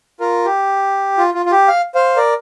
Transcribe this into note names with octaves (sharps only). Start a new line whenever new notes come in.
F4 A#4
G4
F4
F4
F4
G4
F5
C5 F5
A#4 D5